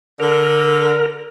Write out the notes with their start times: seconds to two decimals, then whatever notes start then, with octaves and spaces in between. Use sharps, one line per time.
0.20 D3 A#4